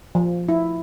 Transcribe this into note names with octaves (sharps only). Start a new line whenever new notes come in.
F3
E4